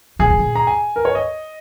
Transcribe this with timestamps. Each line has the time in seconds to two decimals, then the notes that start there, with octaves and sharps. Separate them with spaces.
0.19 A#2 G#4
0.30 G#2
0.39 A#2
0.56 A#5
0.67 G#5
0.96 A#4
1.05 C#5
1.15 D#5